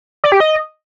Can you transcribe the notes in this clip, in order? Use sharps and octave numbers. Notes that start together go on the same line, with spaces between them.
D5
G4
D#5